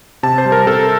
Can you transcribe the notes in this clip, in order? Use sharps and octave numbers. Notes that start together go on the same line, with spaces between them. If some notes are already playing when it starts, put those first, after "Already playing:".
C3 A5
C5
G3
A#4
C3 A4